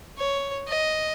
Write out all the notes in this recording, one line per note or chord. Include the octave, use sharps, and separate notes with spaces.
C#5
D#5